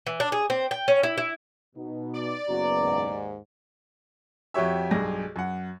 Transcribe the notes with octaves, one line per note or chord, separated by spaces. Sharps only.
E3
D4
G#4
C4
G5
C#4
E4
E4
B2 B3 D#4
D5
F#1 B3 F#4 A#5
D#2 G#2
F2 F#4 G4 C#5 E5
B1 G2 G#4 A#6
F#2 F#5